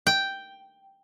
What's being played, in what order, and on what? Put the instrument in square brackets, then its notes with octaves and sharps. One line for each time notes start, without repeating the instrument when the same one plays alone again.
[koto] G5